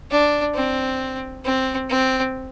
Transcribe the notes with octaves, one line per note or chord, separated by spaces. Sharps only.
D4
C4
C4
C4